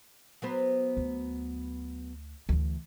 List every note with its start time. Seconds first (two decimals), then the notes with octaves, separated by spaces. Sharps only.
0.42 F#3 B3 C5
0.97 D2
2.49 D2 E3